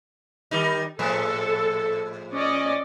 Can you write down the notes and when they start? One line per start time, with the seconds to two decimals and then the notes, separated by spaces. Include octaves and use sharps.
0.51 D#3 G3 D#4
0.99 A2 F3 G#3 A4
2.33 C#4 D5 D#5